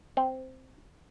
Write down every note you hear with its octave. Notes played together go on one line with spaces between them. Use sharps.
C4